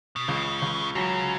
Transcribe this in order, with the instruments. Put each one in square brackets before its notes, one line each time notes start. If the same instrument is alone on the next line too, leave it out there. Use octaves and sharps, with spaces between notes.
[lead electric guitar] B2
[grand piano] C#2 [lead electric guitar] C#3
[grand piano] C#2
[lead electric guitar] C#3 [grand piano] F#3